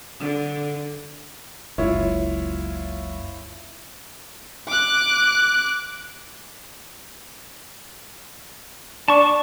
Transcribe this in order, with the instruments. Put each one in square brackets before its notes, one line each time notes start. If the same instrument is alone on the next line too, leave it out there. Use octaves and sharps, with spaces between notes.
[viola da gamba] D3
[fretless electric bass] F#1 C#2 [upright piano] E4 F4 C#5
[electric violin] D6 F#6
[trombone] D4 [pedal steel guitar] A5 C#6